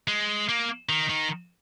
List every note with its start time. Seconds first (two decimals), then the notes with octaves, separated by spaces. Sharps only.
0.08 G#3
0.49 A#3
0.89 D#3
1.09 D#3